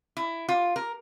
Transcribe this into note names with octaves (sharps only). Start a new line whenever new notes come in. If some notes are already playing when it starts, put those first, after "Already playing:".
E4
F4
A#4